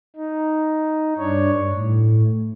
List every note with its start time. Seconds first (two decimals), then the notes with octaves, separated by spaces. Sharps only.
0.16 D#4
1.18 G2 D4 C#5
1.71 A2